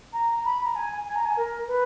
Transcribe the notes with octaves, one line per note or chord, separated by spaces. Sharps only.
A#5
B5
A#5
G#5
G#5
A#5
G#5
A#4
B4